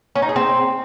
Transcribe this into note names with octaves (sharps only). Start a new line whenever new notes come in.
C#4
D#4
G#4
C4